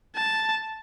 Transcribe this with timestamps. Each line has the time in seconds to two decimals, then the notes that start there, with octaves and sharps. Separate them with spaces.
0.15 A5